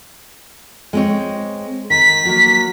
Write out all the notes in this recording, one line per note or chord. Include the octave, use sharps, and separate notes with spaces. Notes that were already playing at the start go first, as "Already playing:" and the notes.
G#3 C4 C#5
D#3 B6
F#3 A#3